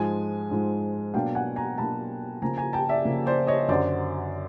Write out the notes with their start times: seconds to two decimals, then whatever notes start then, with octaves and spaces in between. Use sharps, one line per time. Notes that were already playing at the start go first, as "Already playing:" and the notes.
Already playing: G#2 F3 G#3 G#5
0.51 G#2 F3 G#3
1.14 B2 F#3 A#3 D4 F5 G5
1.35 F#5 G#5
1.56 G#5 A#5
1.78 B2 F#3 A#3 D4 A5 B5
2.42 C#3 F3 A#3 G#5 A#5
2.57 G#5 A#5
2.73 G5 A5
2.89 D5 E5
3.05 C#3 F3 A#3
3.26 C5 D5
3.47 C#5 D#5
3.68 F#2 D3 F#3 C5 D5